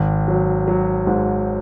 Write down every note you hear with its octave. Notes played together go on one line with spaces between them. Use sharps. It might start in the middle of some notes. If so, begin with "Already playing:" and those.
Already playing: G#1
F#3
F#3
G#2